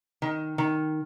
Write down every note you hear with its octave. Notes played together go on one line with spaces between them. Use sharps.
D#3
D#3